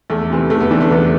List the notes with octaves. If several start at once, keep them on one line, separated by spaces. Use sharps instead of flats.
E2 A3
C3 E3
E2 A3
B3
C3 E3 D4
A3
E2 B3